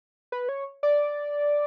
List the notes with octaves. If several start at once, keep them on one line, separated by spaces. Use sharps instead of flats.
B4
C#5
D5